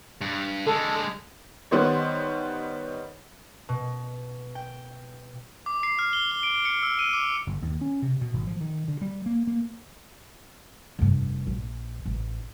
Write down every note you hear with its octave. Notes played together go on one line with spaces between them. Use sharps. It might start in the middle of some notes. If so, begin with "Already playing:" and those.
G2
D3 G#3 A4
D#3 G3 B3 C5 C#5
B2
G5
D6
C7
F6
G7
G7
D7
C#7
E6
D#7
D6
G1
D#2
C#4
C3
B2
G#1
F3
D#3
D3
G3
A#3
A#3
F1 G2
A#1
A1